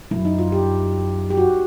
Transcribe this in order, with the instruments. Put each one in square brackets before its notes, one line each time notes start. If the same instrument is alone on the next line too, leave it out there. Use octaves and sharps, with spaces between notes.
[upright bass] F#2 [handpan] E4
[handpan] D#4
F4
G4
G4
F#4